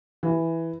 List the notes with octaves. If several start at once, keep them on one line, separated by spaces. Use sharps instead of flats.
E3